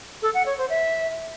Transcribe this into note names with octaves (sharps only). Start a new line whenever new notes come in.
A4
F#5
C#5
C5
E5